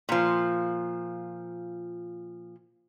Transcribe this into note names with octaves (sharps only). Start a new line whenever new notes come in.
A#2 F3